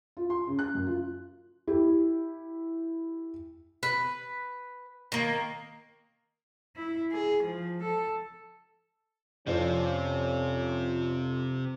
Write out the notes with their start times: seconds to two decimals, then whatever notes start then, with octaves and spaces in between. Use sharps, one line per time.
0.17 F4
0.30 C6
0.47 C#3
0.59 F#6
0.74 F#2
0.87 F4
1.67 E4 G4
3.83 B4
5.12 D#3 A#3
6.76 E4
7.12 G#4
7.44 F3
7.83 A4
9.47 F2 C3 F3 C4 C#4 F4 D5